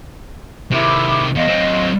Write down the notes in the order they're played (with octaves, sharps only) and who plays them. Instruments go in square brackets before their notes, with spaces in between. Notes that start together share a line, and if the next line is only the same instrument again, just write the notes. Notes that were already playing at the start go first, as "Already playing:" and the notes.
[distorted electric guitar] C3 D#3 [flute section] E4 D6
[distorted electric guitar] E2 [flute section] D#5 F5 C6
[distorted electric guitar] F#3 C4